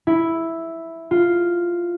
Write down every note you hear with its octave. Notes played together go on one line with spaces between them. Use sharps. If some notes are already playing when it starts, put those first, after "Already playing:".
E4
F4